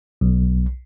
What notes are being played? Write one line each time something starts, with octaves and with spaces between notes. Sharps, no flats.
B1